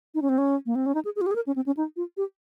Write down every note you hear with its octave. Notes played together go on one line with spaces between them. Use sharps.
D#4
C#4
C4
C#4
A#3
C4
C#4
D#4
G#4
G#4
F4
G4
G#4
A#4
C#4
C4
C#4
D#4
F4
G4